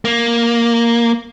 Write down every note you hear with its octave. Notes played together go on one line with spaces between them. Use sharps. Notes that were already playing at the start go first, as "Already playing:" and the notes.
A#3